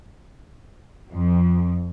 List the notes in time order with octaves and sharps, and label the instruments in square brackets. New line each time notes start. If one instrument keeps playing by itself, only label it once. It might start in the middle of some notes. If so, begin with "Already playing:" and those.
[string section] F2